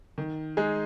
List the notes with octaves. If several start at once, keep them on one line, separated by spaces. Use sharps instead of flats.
D#3
G#3 D#4 G#4